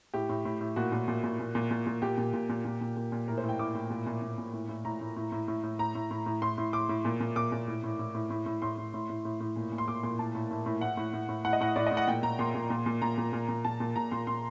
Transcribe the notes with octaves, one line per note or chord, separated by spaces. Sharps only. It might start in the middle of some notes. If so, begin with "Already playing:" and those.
A2 G4
A2
A2
A2
A#2 F#4
A#2
A#2
A#2
A#2
A#2
A#2
A#2
A#2 G4
A#2
A#2
A#2
A#2
A#2
A#2
A#2
A2 A#4
C5
A2
G5
A2 D6
A2
A#2
A#2
A#2
A#2
A2
A2
A2 A#5
A2
A2
A2
A2
A2
A2 A#5
A2
A2
A2
A2 C6
A2
A2 D6
A2
A#2
A#2
A#2 D6
A#2
A2
A2
A2
A2
A2
A2
A2 C6
A2
A2
A2
A2
A2
A#2
A#2
C6
A#2 D6
A#2 C6
A2 A5
A2
A2
A2
A2 F#5
A2
A2
A2
A2 F#5
D#5
A2 F#5
A2 D5
A2 D#5
F#5
A#2 G5
A#2 A#5
A#2 C6
A#2
A#2
A#2
A#2 A#5
A#2
A#2
A#2
A#2 A5
A#2
A#2 A#5
A#2 C6
A#2 C6